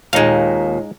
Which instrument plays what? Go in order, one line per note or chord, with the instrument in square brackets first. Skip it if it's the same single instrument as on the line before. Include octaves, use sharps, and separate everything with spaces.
[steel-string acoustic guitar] D#2 A#2 [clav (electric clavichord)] G#3 D#4 F5